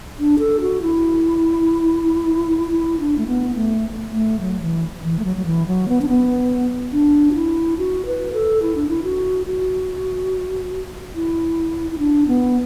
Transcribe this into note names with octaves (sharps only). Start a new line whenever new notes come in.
D4
A4
F#4
E4
E4
D4
A3
B3
A3
A3
F#3
E3
E3
A3
F#3
F#3
E3
F#3
B3
D4
B3
D4
F#4
E4
F#4
B4
A4
E4
D4
E4
F#4
F#4
E4
E4
D4
B3